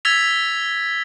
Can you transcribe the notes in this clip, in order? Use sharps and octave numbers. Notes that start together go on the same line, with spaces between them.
E6 G#6 A6 B6 F7